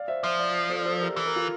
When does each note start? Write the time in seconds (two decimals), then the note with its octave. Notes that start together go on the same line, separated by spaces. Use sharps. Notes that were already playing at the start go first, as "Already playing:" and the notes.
Already playing: D5 F5
0.08 C5 E5
0.23 F3 C5 E5
0.39 D5 F5
0.70 A4 C5
0.80 D5
0.85 A4 C5
1.00 G4 A#4
1.16 E3 A4
1.26 A#4
1.36 F4 A4